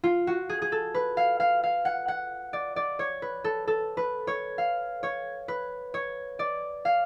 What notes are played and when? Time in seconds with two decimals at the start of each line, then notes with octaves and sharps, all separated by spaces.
0.04 F4
0.27 F#4
0.49 G#4
0.62 G#4
0.72 A4
0.95 B4
1.17 F5
1.40 F5
1.64 F5
1.85 F#5
2.08 F#5
2.53 D5
2.76 D5
2.99 C#5
3.22 B4
3.44 A4
3.68 A4
3.97 B4
4.27 C#5
4.58 F5
5.03 C#5
5.48 B4
5.94 C#5
6.39 D5
6.85 F5